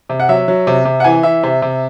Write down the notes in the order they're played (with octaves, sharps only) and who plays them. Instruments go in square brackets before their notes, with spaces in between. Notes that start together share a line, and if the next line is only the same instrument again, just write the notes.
[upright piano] C3
F#5
F#3 E5
F#3
C3
C3
F#5
E3 G#5
E3 E5
C3
C3